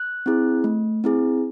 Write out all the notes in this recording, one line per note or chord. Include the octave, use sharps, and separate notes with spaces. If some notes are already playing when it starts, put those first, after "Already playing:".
Already playing: F#6
C4 E4 G#4
A3
C4 E4 G#4